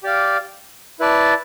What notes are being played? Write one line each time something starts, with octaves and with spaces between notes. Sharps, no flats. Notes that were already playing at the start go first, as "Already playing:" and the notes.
G4 D5 F5
E4 B4 D5 A5